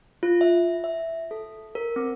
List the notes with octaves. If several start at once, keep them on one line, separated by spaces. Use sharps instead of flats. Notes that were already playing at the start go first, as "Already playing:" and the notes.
F4
E5
E5
A4
A#4
C4